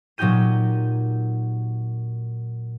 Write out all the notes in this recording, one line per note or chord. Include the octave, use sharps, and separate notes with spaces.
A#2 F#3 D#4 G4 G6 D#7